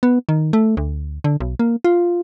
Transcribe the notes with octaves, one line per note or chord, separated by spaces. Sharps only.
B3
D#3
A3
D2
D3
B1
A#3
F4